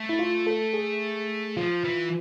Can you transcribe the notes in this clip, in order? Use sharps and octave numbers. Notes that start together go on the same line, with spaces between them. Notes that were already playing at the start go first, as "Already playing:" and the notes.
Already playing: A3
E4
F4
A4
G#4
F3 F4
E3